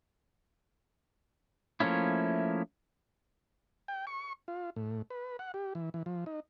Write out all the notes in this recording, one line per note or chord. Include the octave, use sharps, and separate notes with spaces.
F3 A3 A#3 C#4 E4
G5
C#6
F4
A2
B4
F#5
G4
E3
E3
F3
D#4